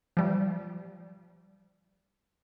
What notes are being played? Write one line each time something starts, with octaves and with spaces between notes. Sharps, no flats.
F3 G3